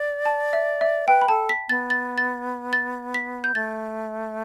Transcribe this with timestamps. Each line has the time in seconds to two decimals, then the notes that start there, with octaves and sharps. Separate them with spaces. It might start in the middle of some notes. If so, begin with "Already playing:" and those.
Already playing: D5
0.25 A5
0.53 E5
0.81 E5
1.08 B4 G5
1.21 B5
1.28 A4 A5
1.49 B6
1.69 B3 A6
1.90 A6
2.18 A6
2.73 A6
3.14 B6
3.44 G6
3.55 A3 A6